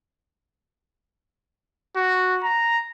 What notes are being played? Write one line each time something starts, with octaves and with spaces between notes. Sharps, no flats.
F#4
A#5